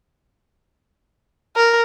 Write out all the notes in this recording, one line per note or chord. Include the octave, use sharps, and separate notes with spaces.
A#4